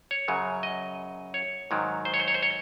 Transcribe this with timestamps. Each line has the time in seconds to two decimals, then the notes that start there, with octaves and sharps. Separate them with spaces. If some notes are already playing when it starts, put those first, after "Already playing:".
0.11 C#5
0.28 F#2 C#3 F#3
0.63 D#5
1.34 C#5
1.71 G#2 D#3 F#3
2.05 C5
2.14 C#5
2.20 C5
2.28 C#5
2.34 C5
2.43 C#5